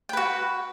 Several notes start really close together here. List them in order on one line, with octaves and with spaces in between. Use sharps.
G5 B4 F#4